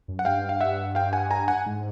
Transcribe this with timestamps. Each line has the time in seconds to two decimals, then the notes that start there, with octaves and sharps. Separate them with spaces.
0.08 F#2
0.19 F#5
0.25 G2 F5 G5
0.49 F5
0.61 E5 F#5
0.95 F5 G5
1.13 F#5 G#5
1.31 G#5 A#5
1.48 F#5 G#5
1.66 G#2